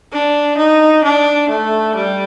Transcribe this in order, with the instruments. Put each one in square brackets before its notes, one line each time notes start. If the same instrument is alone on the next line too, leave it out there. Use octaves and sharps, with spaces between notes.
[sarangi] D4
D#4
D4
A3
G3